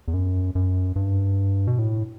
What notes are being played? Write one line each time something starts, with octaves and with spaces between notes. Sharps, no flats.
E2
F#2
F#2
G2
B2
A2